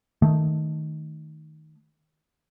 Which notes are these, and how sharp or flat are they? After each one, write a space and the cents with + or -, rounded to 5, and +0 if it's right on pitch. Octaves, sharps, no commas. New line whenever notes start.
D#3 +0 A3 +0